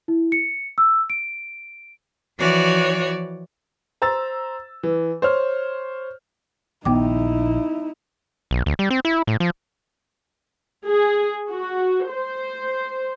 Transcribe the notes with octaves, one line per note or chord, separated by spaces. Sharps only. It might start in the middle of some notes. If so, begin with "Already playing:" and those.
E4
C#7
E6
D7
E3 F3 F#4 C#5 D5
C5 A#5 E6 A6
E3
C5 C#5 F6
A#1 D#3 B3 D#4 E4 G5 D6
B1
D2
G3
C4
E4
A2
F3
G#4
F#4
C5